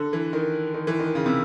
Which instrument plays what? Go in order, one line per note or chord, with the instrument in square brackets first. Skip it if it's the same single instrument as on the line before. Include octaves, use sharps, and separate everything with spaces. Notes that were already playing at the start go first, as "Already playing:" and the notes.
Already playing: [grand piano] D3
E3
D#3
D#3
E3
D#3
C#3
C3